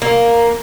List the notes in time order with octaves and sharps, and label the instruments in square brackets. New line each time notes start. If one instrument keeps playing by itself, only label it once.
[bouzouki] A#3